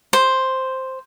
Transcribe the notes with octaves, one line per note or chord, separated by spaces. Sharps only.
C5